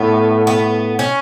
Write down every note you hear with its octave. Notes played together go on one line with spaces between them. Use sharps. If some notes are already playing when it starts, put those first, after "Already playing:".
Already playing: A2 B3
B3
C#4